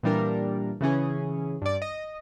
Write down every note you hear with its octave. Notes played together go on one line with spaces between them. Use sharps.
A#2 E3 G3 D4 A#4
C#3 E3 C#4 G#4
G2 D5
D#5